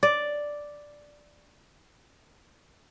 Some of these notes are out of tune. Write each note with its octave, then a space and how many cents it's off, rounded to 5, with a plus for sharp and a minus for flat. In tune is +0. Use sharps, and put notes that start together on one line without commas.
D5 +0